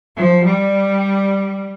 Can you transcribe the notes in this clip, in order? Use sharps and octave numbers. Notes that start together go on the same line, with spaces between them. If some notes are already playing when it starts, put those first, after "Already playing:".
F3
G3